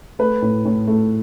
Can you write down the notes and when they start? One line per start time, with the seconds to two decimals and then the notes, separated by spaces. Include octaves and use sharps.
0.19 A3 B4
0.42 A2
0.65 A2
0.87 A3